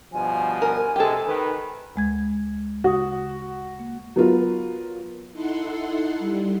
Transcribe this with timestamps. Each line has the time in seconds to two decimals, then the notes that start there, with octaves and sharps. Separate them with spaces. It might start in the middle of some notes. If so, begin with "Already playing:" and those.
0.13 G2 B2 F3 G#5
0.62 A#4
0.96 C3 G#3 G4 A4
1.27 D#3 B4
1.96 D2 G#3 G#6
2.84 C#3 F#4 D#6
3.79 A#3
4.16 F#3 B3 F4 A#4
5.33 D#4 E4 A4 F#5 C6
6.19 G3